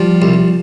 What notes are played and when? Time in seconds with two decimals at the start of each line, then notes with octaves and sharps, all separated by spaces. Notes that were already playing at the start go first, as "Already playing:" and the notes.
Already playing: F3 G3
0.22 C2